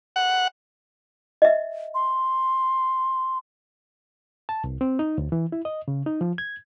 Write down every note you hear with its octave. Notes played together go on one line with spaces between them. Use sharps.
F#5
D#5 E5
C6
A5
C2
C4
D#4
D2
E3
E4
D#5
C#3
D#4
F3
G#6